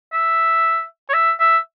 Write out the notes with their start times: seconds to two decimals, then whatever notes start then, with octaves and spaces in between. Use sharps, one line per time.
0.13 E5
1.09 C#5
1.14 E5
1.40 E5